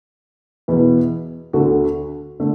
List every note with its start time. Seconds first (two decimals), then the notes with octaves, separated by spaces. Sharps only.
0.68 E2 B2 B3 E4 B4
1.53 D2 D3 A3 F#4
2.40 D3 A3